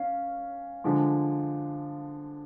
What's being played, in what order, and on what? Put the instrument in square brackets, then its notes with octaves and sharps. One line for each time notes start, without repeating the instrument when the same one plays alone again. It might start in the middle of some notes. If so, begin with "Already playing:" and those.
Already playing: [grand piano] C#4 [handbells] F5
[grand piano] D3 F3 G#3